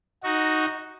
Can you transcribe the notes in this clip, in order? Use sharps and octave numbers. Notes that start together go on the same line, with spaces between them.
D#4 F#4